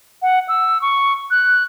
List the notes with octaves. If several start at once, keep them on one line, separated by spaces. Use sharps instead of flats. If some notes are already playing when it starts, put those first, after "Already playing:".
F#5
E6
C#6
F#6